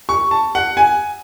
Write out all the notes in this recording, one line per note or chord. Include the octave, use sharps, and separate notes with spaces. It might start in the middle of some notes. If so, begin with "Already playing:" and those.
C#6
A5
F#5
G#5